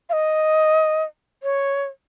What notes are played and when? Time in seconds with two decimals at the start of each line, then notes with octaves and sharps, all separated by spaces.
0.09 F5
0.13 D#5
1.43 C#5